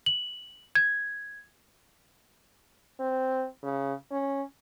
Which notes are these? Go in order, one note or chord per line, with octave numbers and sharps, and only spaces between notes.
F#7
G#6
C4
C#3
C#4